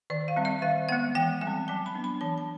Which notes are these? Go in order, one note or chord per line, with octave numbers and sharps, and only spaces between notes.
D#3 D5
F5
G3 C4
E5
D#3 F5
G#3 B3 F#5
E3 G5
G3 G#5
C4
F#3 A5
B5
B3 D4
B5
E3 A5
A5